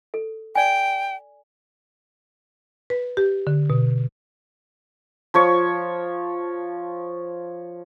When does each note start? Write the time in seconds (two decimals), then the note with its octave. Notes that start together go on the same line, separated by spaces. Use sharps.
0.14 A4
0.55 D5 G5 G#5
2.90 B4
3.17 G4
3.47 D3
3.70 B2
5.34 F3 C#5 C#6